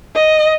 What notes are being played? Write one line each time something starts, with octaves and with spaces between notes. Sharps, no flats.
D#5